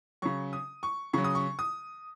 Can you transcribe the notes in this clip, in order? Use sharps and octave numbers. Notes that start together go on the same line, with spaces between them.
C#3 F#3 C#6
D#6
C#6
C#3 F#3 C#6
D#6
C#6
D#6